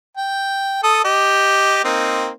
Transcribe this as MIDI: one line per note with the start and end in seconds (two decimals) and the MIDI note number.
0.17 0.80 79
0.83 1.04 69
0.83 1.04 87
1.05 1.83 67
1.05 1.83 75
1.84 2.30 58
1.84 2.30 60
1.84 2.30 63